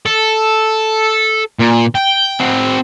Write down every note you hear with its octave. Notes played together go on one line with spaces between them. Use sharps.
A4
A#2
G5
C4 F#4